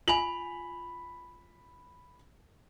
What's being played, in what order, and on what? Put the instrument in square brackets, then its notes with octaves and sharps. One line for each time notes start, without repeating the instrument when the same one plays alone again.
[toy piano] F4 G#5 [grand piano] B5 F7 F#7